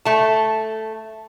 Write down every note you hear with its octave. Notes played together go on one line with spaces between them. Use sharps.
A3 A5